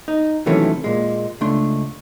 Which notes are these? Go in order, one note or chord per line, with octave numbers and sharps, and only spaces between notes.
D#4
C3 D#3 E3 F#3 A3 C#4
A#2 G#3
C#2 A3 D4 C6